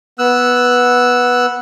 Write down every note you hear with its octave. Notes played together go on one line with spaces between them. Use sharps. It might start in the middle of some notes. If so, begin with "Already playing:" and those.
B3 E6 F#6